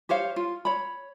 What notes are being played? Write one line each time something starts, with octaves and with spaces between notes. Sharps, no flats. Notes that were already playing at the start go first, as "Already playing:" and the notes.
G4 C5 C#5 F5
F4
C#5 B5